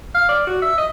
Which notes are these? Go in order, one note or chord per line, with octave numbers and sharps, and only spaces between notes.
F5
D5
F#4
E5
D#5